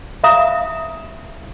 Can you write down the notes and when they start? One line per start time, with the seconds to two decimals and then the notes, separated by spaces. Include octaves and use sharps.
0.24 E5 F5 A#5 D#6